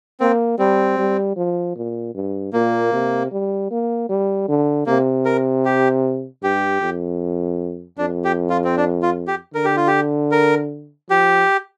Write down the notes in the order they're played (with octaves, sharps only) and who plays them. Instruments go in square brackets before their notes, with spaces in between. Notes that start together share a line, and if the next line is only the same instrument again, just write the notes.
[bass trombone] A#3 [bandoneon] C4
[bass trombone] G3 [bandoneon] C4
[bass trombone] G3
F3
A#2
G2
[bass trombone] A#2 [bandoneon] A#3
[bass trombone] C3
G3
A#3
G3
D3
[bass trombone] C3 [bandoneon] A#3
[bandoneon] A#4
G4
[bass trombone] G2 [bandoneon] G4
[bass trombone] F2
[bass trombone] F2 [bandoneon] D4
[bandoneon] G4
F4
C4
D4
F4
G4
[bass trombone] D3 [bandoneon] A#4
[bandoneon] G4
F4
G4
A#4
[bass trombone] F3 [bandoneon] G4